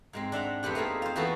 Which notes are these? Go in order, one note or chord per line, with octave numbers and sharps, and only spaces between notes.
G#2 G#3 C4
D4 E5 F#5 A#5
F2 B3 C4 G4 F#5
A3 A#3 D#4 F4 G#4
F4 C5
E3 A#3 B3 E4 F#4 A4